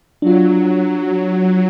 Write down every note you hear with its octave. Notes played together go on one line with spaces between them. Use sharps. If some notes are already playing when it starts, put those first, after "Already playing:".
F#3 D4 F4